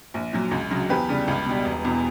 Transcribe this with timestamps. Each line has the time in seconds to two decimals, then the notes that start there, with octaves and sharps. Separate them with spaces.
0.14 A#1
0.33 A#2 F#3
0.51 C#2
0.70 C#3 F#3
0.89 E2 G4 B4
1.09 C#3 G3
1.28 C#2
1.46 B2 G3
1.65 E1
1.84 E2 B2